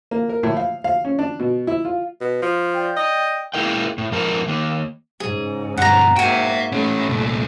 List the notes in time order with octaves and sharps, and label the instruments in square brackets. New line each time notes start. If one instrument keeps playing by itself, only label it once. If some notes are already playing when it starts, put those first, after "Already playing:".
[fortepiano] A#3
A#4
A2
F5
F5
C#4
D4
B2
E4
F4
[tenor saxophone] B2
F3
[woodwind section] D5 G5
[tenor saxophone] D#5
[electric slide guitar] G#3 A#3 E4 A#4 D#5 G5
A2
G#2 F3 A#4 A5
D#3 A#3
[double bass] G#2 C#3 [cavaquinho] G#4
[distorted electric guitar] G2 B2 [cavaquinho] F#5 A#5
[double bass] G#2 A#3 [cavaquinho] F#4 G#5 [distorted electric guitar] E5 G5
[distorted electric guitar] A2 C#4 [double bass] A3
[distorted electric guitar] C2 A#2